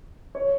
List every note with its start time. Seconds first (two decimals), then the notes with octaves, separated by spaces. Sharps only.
0.35 C#5